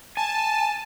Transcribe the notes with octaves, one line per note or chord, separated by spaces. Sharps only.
G#5 A5